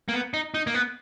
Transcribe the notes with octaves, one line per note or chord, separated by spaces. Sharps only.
A#3
B3
D#4
D#4
A#3
B3